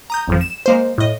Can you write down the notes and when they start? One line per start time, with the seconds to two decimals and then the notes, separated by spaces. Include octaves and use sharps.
0.10 A#5 D#6 G6
0.28 G#1 F2 F3
0.41 E7
0.66 G#3 A#3 C5
0.98 A2 D#5